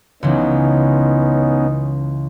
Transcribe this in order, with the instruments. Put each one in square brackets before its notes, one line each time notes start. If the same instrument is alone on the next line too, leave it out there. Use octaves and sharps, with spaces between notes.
[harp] C#2 E3 [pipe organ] B3 C#4 D#4